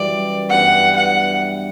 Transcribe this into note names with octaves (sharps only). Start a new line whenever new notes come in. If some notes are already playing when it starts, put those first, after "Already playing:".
Already playing: F#2 E3 G3 D5
G2 E3 G3 B3 F#5
F#5